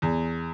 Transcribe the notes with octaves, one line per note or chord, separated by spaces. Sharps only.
E2